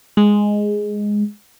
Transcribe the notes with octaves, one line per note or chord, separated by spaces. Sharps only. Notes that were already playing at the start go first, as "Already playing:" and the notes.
G#3